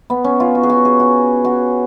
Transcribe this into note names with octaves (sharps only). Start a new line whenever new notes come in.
B3
C#4
F4
F#4
G#4
F#4
G#4
F#4
F#4